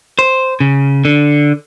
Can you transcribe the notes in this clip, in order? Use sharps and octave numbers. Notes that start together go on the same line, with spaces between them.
C5
C#3
D3